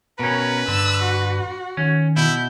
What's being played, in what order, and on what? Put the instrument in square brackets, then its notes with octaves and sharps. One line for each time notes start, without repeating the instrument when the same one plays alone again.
[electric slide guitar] B2 C#4 [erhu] A#4 [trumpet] B4
[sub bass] G2 [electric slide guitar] D3 [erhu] E6
[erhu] F#4
[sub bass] D#3 [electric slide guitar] C#4
[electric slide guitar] B2 [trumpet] E4 [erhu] G6